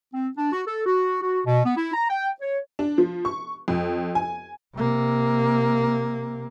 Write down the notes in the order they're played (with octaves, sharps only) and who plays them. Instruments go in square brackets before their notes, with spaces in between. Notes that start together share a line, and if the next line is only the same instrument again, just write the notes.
[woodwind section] C4
D4
F#4
A4
F#4
F#4
B2
B3
E4
A#5
G5
C#5
[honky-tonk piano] D4
F3
C#6
F2
G#5
[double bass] C3 A#3